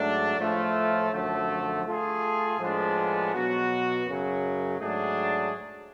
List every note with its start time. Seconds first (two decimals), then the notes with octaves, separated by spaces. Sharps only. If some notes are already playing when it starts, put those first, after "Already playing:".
Already playing: G#2 F#3 A3 D4
0.37 A2 F3 A3 F4
1.12 F#2 D3 F3 A3
1.85 A3 F4 G#4
2.59 A2 F3 G#3 B3 D4
3.33 B2 F#3 B3 F#4
4.06 F#2 C#3 F#3
4.80 G#2 F#3 A3 D4 G#4